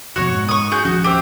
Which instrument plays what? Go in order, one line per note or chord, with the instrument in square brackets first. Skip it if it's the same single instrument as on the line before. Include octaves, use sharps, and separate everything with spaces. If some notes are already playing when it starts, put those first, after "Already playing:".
[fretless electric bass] F1 F2 B2 [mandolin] F#4 C#5 C#6
[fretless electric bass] G#2
[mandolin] C#6 D#6
F#4 G#4 G6
[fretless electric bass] D#1 F3 C#4 [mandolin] F#4
[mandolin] G4 C5 E5